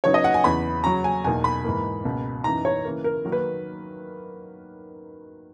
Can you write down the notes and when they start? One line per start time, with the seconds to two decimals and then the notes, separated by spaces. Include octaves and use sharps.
0.04 C#3 F#3 B3 D#4 C#5
0.14 D#5
0.24 F#5
0.34 G#5
0.44 E2 C#3 E3 B5
0.84 C#3 F#3 C#4 A#5
1.04 G#5
1.24 E2 B2 A#3 D#4 G#5
1.44 B5
1.64 G#2 E3 A#3
2.05 C#2 B2 A#3
2.44 F#2 E3 B3 D#4 A#5
2.65 C#5
2.85 C#3 E3 A#3
3.04 A#4
3.25 D#3 F#3 A#3 D#4
3.32 B4